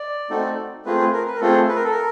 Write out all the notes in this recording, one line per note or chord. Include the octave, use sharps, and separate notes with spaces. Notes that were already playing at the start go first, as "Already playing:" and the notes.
Already playing: D5
A3 C4 D#4 F#4 A4
A3 C4 F4 G#4 B4
B4
A#4
B4
A#4
A3 C4 F4 G#4 A4
B4
A#4
A4
A#4